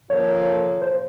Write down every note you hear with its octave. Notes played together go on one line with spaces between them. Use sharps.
F3 A#3 C#4 F4 A4 C#5
C5